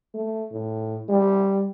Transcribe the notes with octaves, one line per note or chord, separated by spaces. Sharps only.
A3
A2
G3